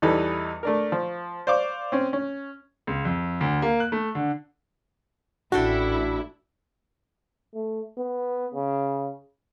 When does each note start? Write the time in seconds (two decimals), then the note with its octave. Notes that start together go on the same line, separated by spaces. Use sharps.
0.02 E2 E3 G3 D#4 A4 B4
0.63 A3 D4 A#4
0.92 F3
1.47 C5 D5 F5 C#6 D6
1.92 C4 C#4
2.13 C#4
2.87 C#2
3.05 F2
3.41 D2
3.62 A#3
3.80 F#6
3.92 A3
4.15 D3
5.52 A1 D4 E4 F#4 A4 G5
7.55 A3
7.98 B3
8.54 C#3